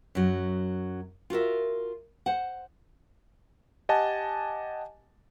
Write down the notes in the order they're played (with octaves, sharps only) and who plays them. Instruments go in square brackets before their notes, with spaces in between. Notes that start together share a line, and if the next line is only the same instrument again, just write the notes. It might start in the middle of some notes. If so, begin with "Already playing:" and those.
[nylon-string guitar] F#2 F#3
F4 F#4 A#4 E5
C5 F#5
[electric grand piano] G4 D#5 F#5 G#5 A5